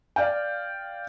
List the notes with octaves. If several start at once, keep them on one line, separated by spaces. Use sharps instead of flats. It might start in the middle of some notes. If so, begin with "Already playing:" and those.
D5 F5 G5